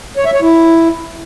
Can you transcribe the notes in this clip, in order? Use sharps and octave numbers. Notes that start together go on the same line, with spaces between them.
C#5
E5
C#5
E4